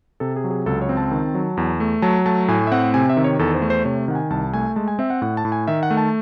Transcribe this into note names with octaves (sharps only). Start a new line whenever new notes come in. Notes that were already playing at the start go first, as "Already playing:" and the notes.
C3 A4
G#4
F#3
G#4
C#2 A4
C#5
C4
A5
D#3
F#3
E2
A3
F#3 A5
A3 A5
A2 G#5
E5
C4 F#5
C3 G#5
E5
D#3
C#5
E2 A4
C5
A3
C5
C3 C#5
D#3 F#5
G#5
C2 A5
A3 G#5
G#3 A5
G#5
C4 E5
F#5
A2 F#5
A5
A2
G#5
D#3 E5
F#5
A3
A5